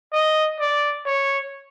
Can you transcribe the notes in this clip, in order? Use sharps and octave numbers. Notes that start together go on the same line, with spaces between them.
D#5
D5
C#5